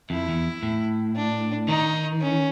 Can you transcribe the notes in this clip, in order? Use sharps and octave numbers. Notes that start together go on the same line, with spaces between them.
F2 E4
E2
A2
D4
D#3 D#4
C#4